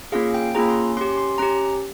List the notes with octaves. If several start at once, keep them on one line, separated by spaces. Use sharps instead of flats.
A#3 C#4 F4 G#4 F5
G5
A#3 C#4 F4 G#4 A#5
C6
C#4 G4 C6
C6
C#4 G4 A#5